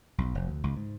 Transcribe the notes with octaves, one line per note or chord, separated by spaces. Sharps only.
B1
F1
D2
C#2
G#2